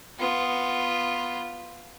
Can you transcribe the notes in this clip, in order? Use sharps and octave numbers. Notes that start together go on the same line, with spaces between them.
B3 F4